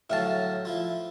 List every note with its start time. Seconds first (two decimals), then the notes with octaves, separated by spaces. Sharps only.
0.10 A2 D3 F#3 E5 F5 A5
0.65 F3 E4 F4